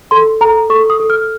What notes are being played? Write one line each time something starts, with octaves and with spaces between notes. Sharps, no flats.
A4 C6
A4 A#5
A4 C#6
D#6
A4
F6